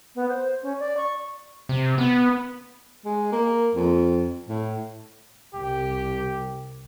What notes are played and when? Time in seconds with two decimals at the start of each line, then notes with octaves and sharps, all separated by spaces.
0.15 B3
0.28 C5
0.62 C#4
0.79 D5
0.97 C#6
1.69 C3
1.98 B3
3.05 G#3
3.32 A#3
3.75 F2
4.49 A2
5.54 C2 G4